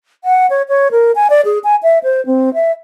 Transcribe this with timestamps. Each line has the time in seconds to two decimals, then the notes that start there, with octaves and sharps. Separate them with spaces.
0.24 F#5
0.50 C#5
0.69 C#5
0.91 A#4
1.16 G#5
1.30 D5
1.45 G#4
1.64 G#5
1.83 E5
2.04 C5
2.26 C4
2.54 E5